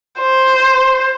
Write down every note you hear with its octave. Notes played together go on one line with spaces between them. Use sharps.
C5